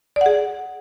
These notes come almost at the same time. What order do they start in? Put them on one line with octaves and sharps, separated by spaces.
D5 F#5 G#4